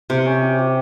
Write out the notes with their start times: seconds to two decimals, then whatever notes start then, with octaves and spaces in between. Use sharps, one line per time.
0.10 C3 C5
0.26 C#4
0.42 G4
0.59 G4